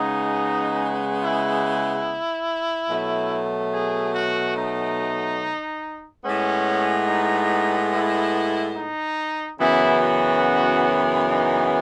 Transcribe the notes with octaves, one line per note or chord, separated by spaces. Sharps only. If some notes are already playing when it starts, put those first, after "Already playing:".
Already playing: C#3 G#3 B3 D#4
E4
B2 F#3 A3
G#4
F#4
D#4
A2 G#3 B3 C#4
D#4
E4
D#4
F#2 C#3 E3 B3 E4
F#4
D#4